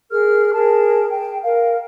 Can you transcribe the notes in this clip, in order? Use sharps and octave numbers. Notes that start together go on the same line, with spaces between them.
G#4 A#4 F6
G#4 A#4 A5
G5
A#4 F5